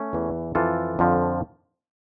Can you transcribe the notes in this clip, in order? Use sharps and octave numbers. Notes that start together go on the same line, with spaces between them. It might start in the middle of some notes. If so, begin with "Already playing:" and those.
Already playing: A3 C#4
E2 E3
F2 E3 F4 A4
F2 D3 F3